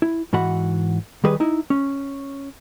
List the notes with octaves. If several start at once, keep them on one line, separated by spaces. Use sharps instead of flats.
E4
G#2 E3 F#4 F#5 B5
D#3 G3 G#4 B4
D#4 E4
C#4